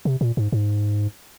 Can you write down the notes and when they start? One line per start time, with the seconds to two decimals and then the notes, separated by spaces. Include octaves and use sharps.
0.05 C3
0.21 A#2
0.37 G#2
0.52 G#2